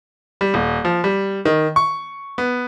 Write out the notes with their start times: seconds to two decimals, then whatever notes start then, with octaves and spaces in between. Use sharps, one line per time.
0.41 G3
0.54 D#1
0.85 F3
1.04 G3
1.45 D#3
1.76 C#6
2.38 B3